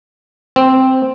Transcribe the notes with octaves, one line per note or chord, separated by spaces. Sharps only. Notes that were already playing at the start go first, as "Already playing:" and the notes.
C4